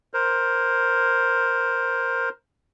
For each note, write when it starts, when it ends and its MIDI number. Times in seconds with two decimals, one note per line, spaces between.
0.14 2.29 70
0.14 2.29 72